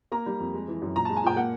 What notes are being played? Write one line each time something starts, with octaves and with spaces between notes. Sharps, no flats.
A#3 A#5
G3
F2
G#3
E3
F#2
A#2 A#5
G#3 A5
G#5
A#2 G5
A#3 F#5